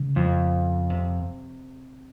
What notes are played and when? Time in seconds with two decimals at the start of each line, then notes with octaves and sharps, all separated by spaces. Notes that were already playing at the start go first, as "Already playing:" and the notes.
Already playing: C#3
0.16 F2
0.90 C3